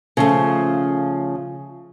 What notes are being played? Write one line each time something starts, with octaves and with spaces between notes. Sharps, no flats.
C#3 F3 A3